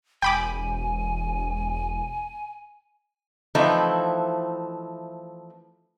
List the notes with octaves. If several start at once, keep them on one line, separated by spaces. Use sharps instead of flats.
E1 G5 G#5 B5 D6
E3 F3 A3 C4 D#4 E4